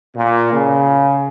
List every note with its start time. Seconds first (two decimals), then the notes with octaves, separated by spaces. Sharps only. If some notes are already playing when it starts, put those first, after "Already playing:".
0.16 A#2
0.52 C#3